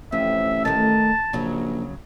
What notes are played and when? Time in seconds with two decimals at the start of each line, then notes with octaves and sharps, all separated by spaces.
0.12 A1 F2 E5
0.65 D#3 A3 A5
1.33 A#1 C#3 F#3